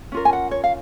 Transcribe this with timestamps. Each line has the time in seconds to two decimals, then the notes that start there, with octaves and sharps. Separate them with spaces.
0.12 C#4 F4 A#4
0.25 G#5
0.33 F#5
0.51 C#5
0.64 F5